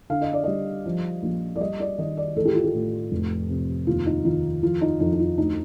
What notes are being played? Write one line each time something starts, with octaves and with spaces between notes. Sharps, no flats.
D3 F5
D#5
D5
G3 D#5
F3
A#1
D5
G3 D#5
D5
D#3 D#5
D5
A1 A4
G4
F4
G4
A2
F1
C3
D#2 F4
D#4
D#3 F4
F2 F4
D#4
F2 D#4
D#4
F4
D2 D#4